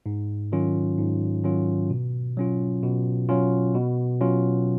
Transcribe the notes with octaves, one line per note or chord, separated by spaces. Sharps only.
G#2
D#3 F#3 C#4 F4
G#2
D#3 F#3 C#4 F4
B2
F#3 C#4 F4
B2
F#3 C#4 F4
B2
F#3 C#4 F4